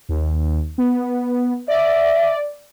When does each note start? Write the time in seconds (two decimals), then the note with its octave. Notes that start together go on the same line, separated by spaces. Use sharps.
0.09 D#2
0.78 B3
1.68 D5 E5